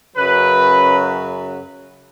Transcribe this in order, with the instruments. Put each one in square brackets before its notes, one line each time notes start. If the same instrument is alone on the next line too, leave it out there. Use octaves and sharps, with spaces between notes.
[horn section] F#2 C#3 F#3 B4